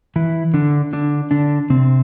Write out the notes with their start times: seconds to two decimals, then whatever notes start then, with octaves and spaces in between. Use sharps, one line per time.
0.16 E3 E4
0.54 D3 D4
0.93 D3 D4
1.31 D3 D4
1.70 C3 C4